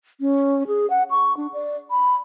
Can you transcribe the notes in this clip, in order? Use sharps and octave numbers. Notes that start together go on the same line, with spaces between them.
C#4
G#4
F#5
C#6
D4
D5
B5